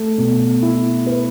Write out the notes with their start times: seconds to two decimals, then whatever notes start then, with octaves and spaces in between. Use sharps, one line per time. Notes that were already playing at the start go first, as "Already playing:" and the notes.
Already playing: A3
0.18 B2
0.62 E4
1.06 B4